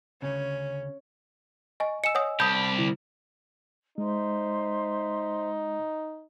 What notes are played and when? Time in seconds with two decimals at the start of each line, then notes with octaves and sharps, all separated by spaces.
0.22 D2 A2 C#3 C#4
1.80 D#5 G#5 C#6
2.04 D#5 G#5 E6 C#7 E7
2.15 C#5 F#5 D#6
2.40 C2 G4 A5 B5 D#6 G6
2.79 D3 E4
3.98 G#3 D#4 C5 E5 C6